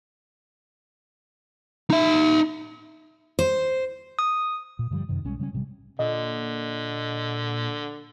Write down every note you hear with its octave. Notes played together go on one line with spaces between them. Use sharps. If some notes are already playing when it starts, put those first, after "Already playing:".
D#4 E5
C5
D#6
A#2
G2 D3 F3 G3
F#2 C3 D#3
B1 G3 G#3 C#4
C#3 G3 A3 C#4
A1 C3 G3
A#2 D3 D#5